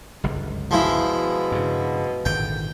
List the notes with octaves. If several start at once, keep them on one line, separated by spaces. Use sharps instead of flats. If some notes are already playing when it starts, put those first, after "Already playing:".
G1 C#2 F#2
B2 F3 G#3 E4
G2 C#3
G#1 A#2 D3 G5